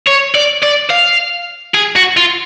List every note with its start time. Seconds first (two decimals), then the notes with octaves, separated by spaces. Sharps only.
0.07 C#5
0.35 D5
0.63 D5
0.90 F5
1.75 G#4
1.96 F#4
2.17 F4